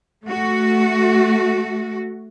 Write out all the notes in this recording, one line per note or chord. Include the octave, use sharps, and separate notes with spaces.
A3 F#4